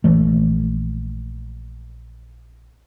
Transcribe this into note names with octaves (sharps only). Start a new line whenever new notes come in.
A#1 E3 A3